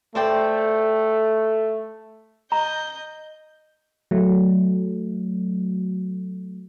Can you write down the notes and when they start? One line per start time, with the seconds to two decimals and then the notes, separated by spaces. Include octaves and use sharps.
0.15 A3 C5 D5 G5
2.52 D#5 A#5 G6
4.11 F#3 A3